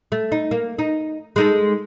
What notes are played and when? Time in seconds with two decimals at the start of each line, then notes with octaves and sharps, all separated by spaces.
0.12 A3
0.32 D#4
0.51 A#3
0.79 D#4
1.36 G#3 D#4 A4